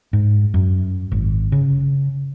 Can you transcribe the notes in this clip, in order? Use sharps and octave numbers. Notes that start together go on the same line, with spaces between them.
G#2
F#2
G#1
C#3